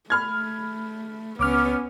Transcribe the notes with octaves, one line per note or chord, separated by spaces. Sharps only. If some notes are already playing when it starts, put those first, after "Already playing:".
A3 B5 F6 G#6
C#2 B3 C#4 D6 F6